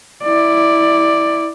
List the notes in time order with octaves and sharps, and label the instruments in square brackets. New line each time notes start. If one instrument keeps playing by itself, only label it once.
[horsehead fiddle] E4 D5